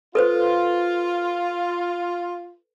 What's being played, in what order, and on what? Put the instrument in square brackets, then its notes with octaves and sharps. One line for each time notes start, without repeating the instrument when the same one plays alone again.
[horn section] F4 [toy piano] A4 B4 C5